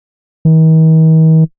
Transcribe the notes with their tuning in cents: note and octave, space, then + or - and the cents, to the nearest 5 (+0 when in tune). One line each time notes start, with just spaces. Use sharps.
D#3 +45